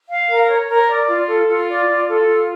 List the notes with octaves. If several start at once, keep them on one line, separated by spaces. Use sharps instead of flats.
F5
A#4
C#5
A#4
D5
F4
A4
F4
D5
F4
A4
F4